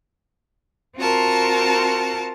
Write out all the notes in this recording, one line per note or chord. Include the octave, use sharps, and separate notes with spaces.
C4 F4 F#4 A#4 A5 A#5